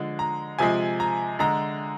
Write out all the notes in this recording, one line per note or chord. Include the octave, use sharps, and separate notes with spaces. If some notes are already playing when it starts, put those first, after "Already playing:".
Already playing: D3 F3 G#3
A#5
C3 F3 G#3 G#5
A#5
D3 G#3 A#5